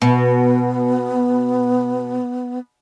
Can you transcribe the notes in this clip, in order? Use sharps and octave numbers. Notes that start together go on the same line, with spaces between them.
B2 B3